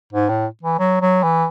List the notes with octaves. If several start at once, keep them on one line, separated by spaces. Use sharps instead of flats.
G#2
A2
E3
F#3
F#3
E3